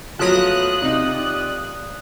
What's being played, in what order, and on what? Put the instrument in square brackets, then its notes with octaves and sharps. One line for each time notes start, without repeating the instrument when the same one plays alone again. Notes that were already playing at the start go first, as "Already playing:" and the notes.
[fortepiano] F3 F#3 [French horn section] A3 B3 F4 [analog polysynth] D#6 F#6
[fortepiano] C3 D#4 [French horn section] F4 G4 D5